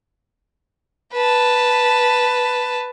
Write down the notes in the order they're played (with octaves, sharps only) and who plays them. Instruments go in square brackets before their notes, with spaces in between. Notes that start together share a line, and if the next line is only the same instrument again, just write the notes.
[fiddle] B4 A5